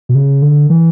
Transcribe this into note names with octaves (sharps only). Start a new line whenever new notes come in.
B2
C#3
D3
E3